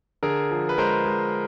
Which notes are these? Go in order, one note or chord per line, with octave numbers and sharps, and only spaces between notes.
D3 G#4 A#4
F3
B4
G#3 A#4 C5
G#3